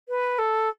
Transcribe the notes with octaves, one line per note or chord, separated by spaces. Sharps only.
B4
A4